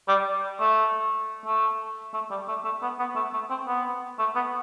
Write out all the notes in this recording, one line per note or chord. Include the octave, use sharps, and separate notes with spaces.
G3
A3
A3
A3
G3
A3
A3
B3
B3
A3
A3
C4
B3
A3
B3